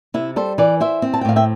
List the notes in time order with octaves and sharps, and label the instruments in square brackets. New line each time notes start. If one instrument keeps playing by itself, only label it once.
[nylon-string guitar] C3 E4
G3 A4 C5
E3 B4 D5
E4 C5 E5
C4
A5
G5
A2 F5
E5 G5